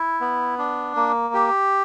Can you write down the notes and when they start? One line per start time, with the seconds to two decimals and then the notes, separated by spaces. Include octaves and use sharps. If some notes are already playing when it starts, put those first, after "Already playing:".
Already playing: E4
0.21 B3
0.58 D4
0.96 A#3
1.34 G4